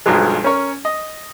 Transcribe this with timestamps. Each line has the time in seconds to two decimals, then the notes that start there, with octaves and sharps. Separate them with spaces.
0.06 B1 G2 F3 F#3 G#3
0.44 C#4 A#4 C#5
0.85 D#5